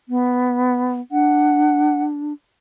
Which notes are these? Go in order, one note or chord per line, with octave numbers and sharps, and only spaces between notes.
B3
D4 F#5